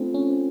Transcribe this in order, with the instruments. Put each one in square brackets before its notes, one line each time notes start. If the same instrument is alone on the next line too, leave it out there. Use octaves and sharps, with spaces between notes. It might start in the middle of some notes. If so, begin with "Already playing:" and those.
Already playing: [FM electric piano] A3 C4 [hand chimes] D4 F4 A4 C5
[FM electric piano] C#4